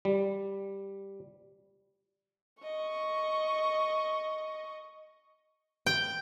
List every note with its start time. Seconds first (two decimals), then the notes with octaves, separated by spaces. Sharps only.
0.05 G3
2.63 D#5 C#6
5.86 G5